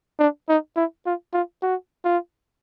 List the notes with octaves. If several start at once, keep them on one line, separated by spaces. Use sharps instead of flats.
D4
D#4
E4
F4
F4
F#4
F4